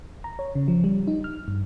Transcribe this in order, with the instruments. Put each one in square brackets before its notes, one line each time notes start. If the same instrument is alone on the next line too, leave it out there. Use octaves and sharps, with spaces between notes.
[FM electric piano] A#5
C#5
C#3
F3
G3
D#4
F6
G2